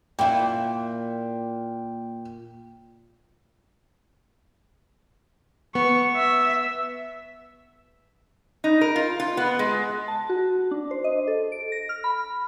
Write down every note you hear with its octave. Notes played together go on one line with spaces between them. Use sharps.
A#2 E4 G5
B3 C#6
E5
D#4
A#4
F4
F4
B3
G#3
A5
F#4
D4
C5
D#5
A4
D7
A#6
F6
B5